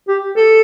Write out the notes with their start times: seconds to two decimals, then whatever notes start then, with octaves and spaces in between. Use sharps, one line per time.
0.08 G4
0.37 A4